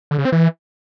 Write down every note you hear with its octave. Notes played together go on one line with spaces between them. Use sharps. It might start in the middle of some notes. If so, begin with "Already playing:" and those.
D3
C#3
C4
E3